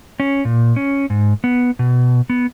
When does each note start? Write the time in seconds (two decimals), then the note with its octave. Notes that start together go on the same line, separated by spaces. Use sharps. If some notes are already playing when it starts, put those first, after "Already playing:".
0.20 C#4
0.45 A#2
0.76 C#4
1.10 G#2
1.44 B3
1.79 B2
2.30 B3